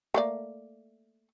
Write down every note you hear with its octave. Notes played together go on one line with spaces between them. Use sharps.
A3 A#3 D5